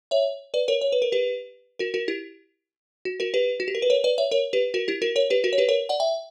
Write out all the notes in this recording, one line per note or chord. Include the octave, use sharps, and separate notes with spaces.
C#5 E5
B4 D5
A#4 C#5
C#5
B4
A#4
G4 B4
F#4 A#4
F#4 A#4
E4 G4
F#4
F#4 A#4
G4 B4
F#4
G4
A#4
B4
A#4 C#5
B4 D5
C#5 E5
A#4 C#5
G4 B4
F#4 A#4
E4 G4
F#4 A#4
A#4 C#5
G4 B4
F#4 A#4
C#5
G4 B4
A#4 C#5
D5 F#5
E5 G5